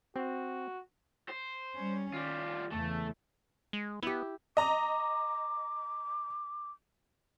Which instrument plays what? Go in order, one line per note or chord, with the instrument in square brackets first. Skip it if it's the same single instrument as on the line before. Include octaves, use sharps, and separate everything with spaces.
[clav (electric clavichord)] C4 [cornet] F#4
[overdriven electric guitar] C5
[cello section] G3 C#4
[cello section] D#3 [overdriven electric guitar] G3 F4
[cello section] E2 C#3 E3 [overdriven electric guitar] A3
[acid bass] G#3
[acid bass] B3 [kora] E4 G4
[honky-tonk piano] D#5 A#5 [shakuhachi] D6